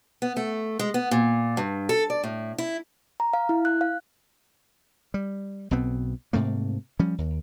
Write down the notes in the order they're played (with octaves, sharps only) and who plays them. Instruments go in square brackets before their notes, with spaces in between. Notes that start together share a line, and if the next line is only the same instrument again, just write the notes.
[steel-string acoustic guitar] B3
A3
G#3
B3
A#2
G2
A4
D5
A2
E4
[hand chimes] A#5
F5
E4
F#6
F5
[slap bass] G3
B1 B2 B3 C4
G#2 C3 A3 A#3
F3 G3 C#4
D#2